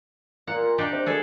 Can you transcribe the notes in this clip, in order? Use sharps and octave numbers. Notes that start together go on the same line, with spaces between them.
A#2 F#5
D4 D#4 G4
C3
D2 A#2 G#3 G#4 A4